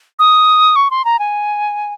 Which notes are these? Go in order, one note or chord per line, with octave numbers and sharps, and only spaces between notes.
D#6
C#6
C6
A#5
G#5